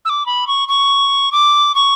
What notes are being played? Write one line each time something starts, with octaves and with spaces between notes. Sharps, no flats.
E6
D6
B5
C#6
C#6
D6
C#6